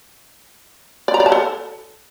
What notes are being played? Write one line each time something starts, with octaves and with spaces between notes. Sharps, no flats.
D5
A#5
D5
A5
A4